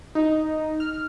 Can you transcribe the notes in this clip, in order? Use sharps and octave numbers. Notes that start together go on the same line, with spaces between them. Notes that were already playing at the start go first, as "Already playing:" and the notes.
D#4
F6